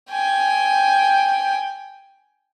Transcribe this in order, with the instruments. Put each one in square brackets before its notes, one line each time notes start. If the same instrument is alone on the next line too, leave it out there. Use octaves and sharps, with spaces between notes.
[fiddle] G5 G#5